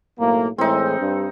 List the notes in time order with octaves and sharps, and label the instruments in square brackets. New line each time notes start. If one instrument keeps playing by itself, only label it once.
[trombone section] B1 A2 A#3
[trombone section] A2 E3 G#3 [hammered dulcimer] C4 D#4
[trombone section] G2